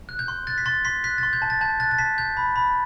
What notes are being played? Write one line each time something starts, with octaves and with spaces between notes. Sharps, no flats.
F#6
G6
C6
F#6 A6
B6
C6 A6
C6 B6
F#6 B6
C6 A6
G6
A5
A6
A5 G6
F#6 A6
A6
A5 B6
G6
B5
B5